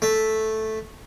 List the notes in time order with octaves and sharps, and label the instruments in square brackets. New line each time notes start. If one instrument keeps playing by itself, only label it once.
[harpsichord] A3